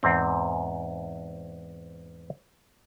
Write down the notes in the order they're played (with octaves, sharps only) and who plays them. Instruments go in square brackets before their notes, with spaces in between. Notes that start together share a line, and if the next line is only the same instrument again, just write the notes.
[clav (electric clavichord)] E2 G#2 C4